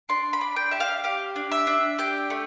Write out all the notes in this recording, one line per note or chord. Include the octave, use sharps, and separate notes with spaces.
D4 C6
B5
D4
G5
G4 E5
F5
G4 F5
D4
E5
D4
G4 G5
A3